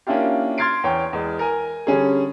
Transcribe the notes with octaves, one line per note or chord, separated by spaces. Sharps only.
A#3 C#4 D4 E4 F4 G4
C6 F6 G#6 A6 C7 D7
E2 C#5 G5
E2 G#3
A#4 G#5
D3 G3 C#4 G#4